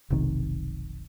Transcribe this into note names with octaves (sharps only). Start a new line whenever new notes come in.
F1 B1 C3 D#3